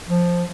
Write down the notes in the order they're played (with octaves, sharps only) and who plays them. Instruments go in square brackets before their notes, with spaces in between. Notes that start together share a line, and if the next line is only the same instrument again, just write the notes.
[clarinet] F3